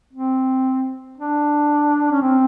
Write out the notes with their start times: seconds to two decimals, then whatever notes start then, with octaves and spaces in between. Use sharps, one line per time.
0.13 C4
1.18 D4
2.12 C#4
2.22 C4